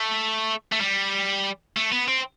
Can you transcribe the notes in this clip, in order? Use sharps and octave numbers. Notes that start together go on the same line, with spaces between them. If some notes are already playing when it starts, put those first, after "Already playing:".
Already playing: A3
A3
G3
A3
B3
C4